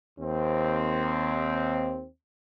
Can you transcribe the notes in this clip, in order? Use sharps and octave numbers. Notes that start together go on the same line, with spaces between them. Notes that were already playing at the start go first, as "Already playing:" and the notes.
D#2 C4